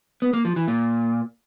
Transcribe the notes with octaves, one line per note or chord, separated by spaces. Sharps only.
B3
A#3
F3
E3
A#2